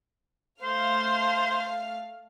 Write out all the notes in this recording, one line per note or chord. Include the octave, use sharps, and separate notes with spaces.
A3 C5 F5 F6